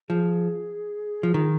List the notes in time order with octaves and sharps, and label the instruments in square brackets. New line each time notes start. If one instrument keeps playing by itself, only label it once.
[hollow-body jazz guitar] F3 [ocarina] G#4
[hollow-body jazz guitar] F3
D#3